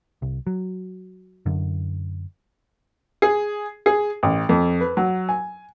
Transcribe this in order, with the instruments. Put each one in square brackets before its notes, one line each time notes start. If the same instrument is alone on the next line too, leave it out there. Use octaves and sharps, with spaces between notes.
[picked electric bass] C2
F#3
F#2 D3
[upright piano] G#4
G#4
A1
F2
B4
F#3
G#5